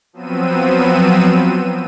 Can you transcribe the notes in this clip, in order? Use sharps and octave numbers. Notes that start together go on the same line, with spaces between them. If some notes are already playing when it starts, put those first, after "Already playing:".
F3 F#3 B3 C4 E6 D#7